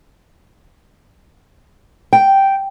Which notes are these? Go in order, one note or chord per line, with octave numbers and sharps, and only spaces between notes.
G5